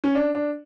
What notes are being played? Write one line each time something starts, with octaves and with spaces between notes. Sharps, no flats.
C#4
D4
D4